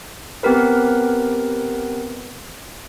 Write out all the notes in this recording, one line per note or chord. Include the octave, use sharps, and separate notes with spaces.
B3 C4 G4 A#4 B4